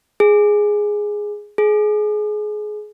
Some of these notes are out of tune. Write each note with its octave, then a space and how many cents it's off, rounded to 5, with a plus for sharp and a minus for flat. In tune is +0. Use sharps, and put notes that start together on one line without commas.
G#4 +0
G#4 +25